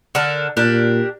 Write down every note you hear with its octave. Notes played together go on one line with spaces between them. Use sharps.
D3 A4 A#4
A#2 D4 G4 A#4